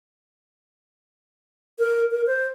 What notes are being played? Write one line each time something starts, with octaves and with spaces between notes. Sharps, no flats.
A#4
A#4
C5